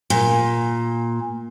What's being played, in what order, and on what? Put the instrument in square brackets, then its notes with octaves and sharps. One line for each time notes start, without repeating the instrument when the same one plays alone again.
[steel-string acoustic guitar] A#2